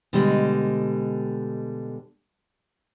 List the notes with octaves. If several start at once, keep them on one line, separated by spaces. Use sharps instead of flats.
B2 D3 G3 G#3 A4 D#5